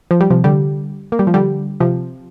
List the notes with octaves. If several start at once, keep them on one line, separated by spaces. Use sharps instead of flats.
F3
G3
C3 F3
D3 G3
A#3
G3
F3
D3 G3
C3 F3